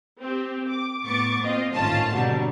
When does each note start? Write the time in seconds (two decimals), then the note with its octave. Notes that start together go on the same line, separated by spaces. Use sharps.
0.21 C4 G4
0.67 D6
1.05 A2 B3 C#6 D6 A6
1.42 A#3 C4 F4 D#5
1.74 G#1 A2 D#3 C#4 F4 A5
2.12 B2 D3 F#3 G3